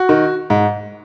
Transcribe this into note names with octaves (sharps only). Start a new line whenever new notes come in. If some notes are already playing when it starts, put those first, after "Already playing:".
Already playing: F#4
D#3
G#2